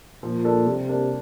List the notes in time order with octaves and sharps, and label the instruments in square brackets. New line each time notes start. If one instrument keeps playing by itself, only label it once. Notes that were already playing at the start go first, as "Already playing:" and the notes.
[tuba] A#2 [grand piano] F3
[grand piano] A#3 D4 A4
[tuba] C3 [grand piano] G3
[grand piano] A#3 D4